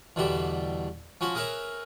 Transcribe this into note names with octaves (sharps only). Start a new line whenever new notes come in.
E2 B2 D3 G3 E5 B5
F3 C#4 F#4 B5
G#4 A#4 B4 C#5 E5